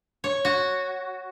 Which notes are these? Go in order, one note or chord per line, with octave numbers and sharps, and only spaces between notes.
C#5
F#4